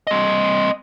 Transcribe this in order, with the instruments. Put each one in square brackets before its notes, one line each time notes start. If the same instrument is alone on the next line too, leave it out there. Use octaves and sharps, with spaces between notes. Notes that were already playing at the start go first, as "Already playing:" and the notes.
[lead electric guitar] C4 D#5